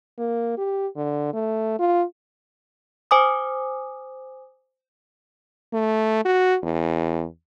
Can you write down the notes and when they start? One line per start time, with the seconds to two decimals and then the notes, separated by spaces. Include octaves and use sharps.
0.18 A#3
0.58 G4
0.96 D3
1.33 A3
1.79 F4
3.11 C5 G#5 D6 D#6
5.73 A3
6.25 F#4
6.63 E2